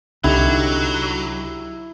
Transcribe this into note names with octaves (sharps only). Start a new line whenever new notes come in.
C2 D3 F#3 D#4 E4 G4